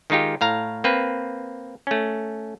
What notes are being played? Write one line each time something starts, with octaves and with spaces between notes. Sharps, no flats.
D#3 G#3 D#4 F4 G4
A2 F5 A#5
A#3 C4 B4
A3 C#4